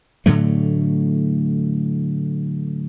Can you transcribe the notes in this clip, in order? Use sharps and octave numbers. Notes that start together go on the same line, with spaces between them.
A2 D3 F#3 A3